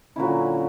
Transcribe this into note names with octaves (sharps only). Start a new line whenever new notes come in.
A#2 D3 F#3 C#4 E4